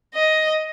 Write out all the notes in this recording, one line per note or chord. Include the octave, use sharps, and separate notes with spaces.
D#5